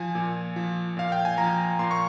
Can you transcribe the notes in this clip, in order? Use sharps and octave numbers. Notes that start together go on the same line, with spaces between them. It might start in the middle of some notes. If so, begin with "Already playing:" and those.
Already playing: F3 G#5
A#2
F3
A#2 F5
G5
G#5
F3 A#5
A#2 C6
C#6